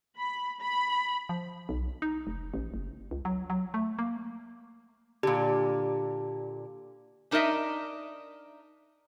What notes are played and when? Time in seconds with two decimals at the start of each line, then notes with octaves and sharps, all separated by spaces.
0.18 B5
0.60 B5
1.29 F3
1.69 B1
2.02 D#4
2.27 F1
2.54 A1
2.74 F#1
3.11 C#2
3.25 F#3
3.50 F#3
3.74 A3
3.99 A#3
5.23 A#2 D3 G4
7.31 D4 D#4 A#4 C5 D#5 E5